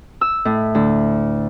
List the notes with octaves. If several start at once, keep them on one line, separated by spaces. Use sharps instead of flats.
E6
A2
D2